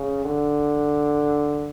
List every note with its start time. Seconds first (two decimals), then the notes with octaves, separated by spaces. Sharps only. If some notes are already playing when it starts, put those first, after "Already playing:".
Already playing: C#3
0.25 D3